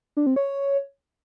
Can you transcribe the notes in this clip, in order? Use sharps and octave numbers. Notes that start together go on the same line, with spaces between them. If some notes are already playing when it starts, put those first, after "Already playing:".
D4
C4
C#5